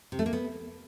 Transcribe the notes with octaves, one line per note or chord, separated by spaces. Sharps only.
C3
A3
A#3
B3